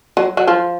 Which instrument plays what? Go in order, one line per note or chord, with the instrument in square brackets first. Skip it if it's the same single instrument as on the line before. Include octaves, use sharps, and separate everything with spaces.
[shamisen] F#3
F#3 F#4
F3 F4